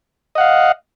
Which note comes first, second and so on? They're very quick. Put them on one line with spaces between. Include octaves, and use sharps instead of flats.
D#5 F#5 F5